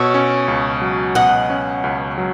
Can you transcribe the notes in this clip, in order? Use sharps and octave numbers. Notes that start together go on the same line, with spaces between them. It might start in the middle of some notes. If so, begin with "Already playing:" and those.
Already playing: B2 C#5 E5
C#4
C#2
F#3
B2 D#5 F#5
C#4
C#2
F#3